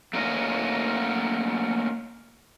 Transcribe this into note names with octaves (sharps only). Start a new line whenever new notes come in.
A3 A#3 C#4 D#5